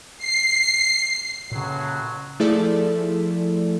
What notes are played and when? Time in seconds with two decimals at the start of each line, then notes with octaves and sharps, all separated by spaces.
0.18 C7
1.51 A1 A#2 C#3 F#3
2.40 F3 A3 E4 G#4 A4 D5